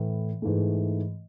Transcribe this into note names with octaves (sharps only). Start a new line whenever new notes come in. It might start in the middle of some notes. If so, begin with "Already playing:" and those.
Already playing: A2 E3 A3
G#2 E3 A3